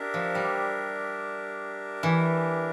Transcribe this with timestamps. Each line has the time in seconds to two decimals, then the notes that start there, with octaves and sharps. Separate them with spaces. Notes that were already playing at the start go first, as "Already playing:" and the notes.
Already playing: D4 G4 A#4 E5
0.14 F3
0.35 G3
2.03 E3